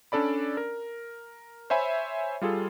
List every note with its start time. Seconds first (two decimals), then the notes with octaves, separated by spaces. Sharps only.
0.12 C#4 D4 A4 D5 B5
0.57 A#4
1.70 C5 C#5 E5 G#5 B5
2.41 G3 F4 G#4 A4